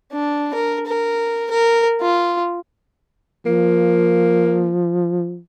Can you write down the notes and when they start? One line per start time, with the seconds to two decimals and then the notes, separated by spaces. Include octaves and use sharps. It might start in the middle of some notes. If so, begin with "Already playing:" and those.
0.12 D4
0.54 A#4
0.87 A#4
1.50 A#4
2.01 F4
3.46 F3 A#3